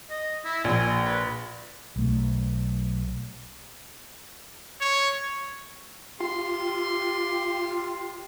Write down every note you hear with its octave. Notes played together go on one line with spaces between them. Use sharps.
D#5
E4
A#1 G#5
B4
B1 A3
C#5
F4 G4 C6